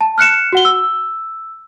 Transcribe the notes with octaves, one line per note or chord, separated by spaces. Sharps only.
A5
F6 F#6 C#7 E7
F#4 F#5 G7
E6